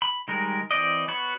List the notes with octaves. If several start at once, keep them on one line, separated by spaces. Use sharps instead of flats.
B5
D#3 G3 G#3 A#4
E3 C4 D5 D#5
B3 F#4 C#5 B5